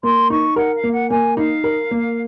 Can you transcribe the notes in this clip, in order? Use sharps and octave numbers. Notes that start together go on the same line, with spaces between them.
A#3 C6
D#4 C#6
A#4 F#5
F5
A#3
F#5
A#3 G#5
D#4 F5
A#4
A#3